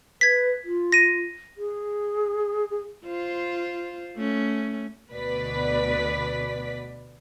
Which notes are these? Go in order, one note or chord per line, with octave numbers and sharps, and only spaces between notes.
B4 G#6 B6
F4
A#6 D#7
G#4
G#4
F4 C5
A3 C#4
D2 B2 B4 D5 B6